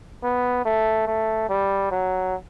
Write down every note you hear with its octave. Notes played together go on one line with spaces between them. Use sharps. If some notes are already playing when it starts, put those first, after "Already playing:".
B3
A3
A3
G3
F#3